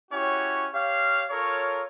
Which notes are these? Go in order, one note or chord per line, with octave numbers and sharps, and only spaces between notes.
C#4 E4 F#4 G4 C#5
G4 C#5 F5
F4 A4 A#4 C#5